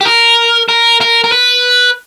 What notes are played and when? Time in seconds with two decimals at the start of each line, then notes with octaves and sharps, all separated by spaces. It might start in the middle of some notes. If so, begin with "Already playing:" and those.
0.01 G4
0.05 A#4
0.69 A#4
1.01 A#4
1.24 A#4
1.32 B4